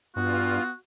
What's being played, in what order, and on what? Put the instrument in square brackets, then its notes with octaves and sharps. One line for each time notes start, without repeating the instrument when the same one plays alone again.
[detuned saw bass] G2 [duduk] B3 [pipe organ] F4 [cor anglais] F#4